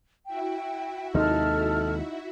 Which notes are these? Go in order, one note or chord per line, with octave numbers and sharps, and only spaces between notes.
E4 F#4 E5 G5
D#2 C3 G#3 D#4 A4 F6